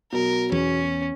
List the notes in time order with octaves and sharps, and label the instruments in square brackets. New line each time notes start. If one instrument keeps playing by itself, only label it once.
[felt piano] B2 F#3 [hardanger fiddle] A#4
[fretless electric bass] E2 [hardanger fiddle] C#4